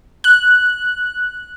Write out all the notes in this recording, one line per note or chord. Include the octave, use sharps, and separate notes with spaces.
F#6